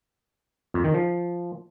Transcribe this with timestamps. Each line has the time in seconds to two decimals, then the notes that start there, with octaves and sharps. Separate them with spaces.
0.74 F2
0.84 D#3
0.94 F3